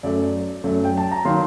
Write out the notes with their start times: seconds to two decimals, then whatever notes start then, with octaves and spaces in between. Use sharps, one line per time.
0.03 F#2 F#3 A3 D5
0.64 F#2 F#3 A3
0.84 G5
0.97 A5
1.12 A#5
1.25 D#3 F#3 A#3 C6